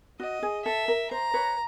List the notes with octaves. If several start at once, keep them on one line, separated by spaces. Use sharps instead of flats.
F#4 D#5
G#4
A4 E5
A#4
C5 A#5
B4 C#5